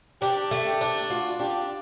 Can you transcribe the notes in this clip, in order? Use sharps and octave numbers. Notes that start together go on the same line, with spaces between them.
D4 G4
A3
G4
D4
F4 F#4
D4 G4